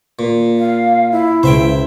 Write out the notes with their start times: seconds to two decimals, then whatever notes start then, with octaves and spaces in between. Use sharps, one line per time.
0.19 A#2
0.57 F5
1.12 E4
1.43 C#2 C5 E5 G5